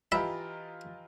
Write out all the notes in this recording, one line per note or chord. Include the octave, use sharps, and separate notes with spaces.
E3 F4 G4 D#5 E5 A#5 B5